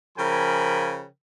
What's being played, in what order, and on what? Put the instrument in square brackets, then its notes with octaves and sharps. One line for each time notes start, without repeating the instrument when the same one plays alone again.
[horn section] C#3 F3 A#4 G5 G#5 B5